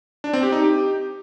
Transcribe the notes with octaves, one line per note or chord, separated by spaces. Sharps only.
D4
C4
G4
D#4
G4